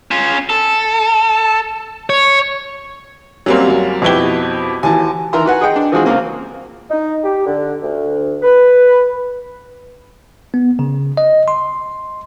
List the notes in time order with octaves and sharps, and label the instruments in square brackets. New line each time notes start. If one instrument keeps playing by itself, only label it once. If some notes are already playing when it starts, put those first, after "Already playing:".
[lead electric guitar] C#4 F4
A4
C#5
[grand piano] F#3 G3 A#3 [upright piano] C4 C#4
[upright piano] F#2
[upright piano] F2 B4 G7 [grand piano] B2 E4 G4
[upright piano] D#2 E3 F#4 [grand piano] G#5 A5
[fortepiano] D#3 E3 A#4 E5 A#5 C6
F#4 B4 F#5 G#5
G#4 D#5 F#5 G5
D4
E3 F3 G#3 C4 F#4 G#4
C#2 C#3 A#3 C4
[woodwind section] D#4
G4
D3
D2
B4
[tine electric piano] B3
C#3
D#5
C6